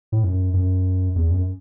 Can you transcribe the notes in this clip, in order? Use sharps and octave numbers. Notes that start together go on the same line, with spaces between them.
A2
F#2
F#2
E2
F#2